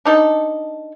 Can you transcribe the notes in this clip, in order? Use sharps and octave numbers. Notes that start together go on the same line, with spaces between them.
D4 D#4 A4